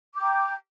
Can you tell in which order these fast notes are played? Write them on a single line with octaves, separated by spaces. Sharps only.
D6 G6 G5 A#5